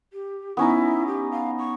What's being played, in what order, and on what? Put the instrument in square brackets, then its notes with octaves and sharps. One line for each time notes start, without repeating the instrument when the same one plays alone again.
[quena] G4
[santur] B3 C#4 D#4 [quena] E4
[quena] G4
F5
C#6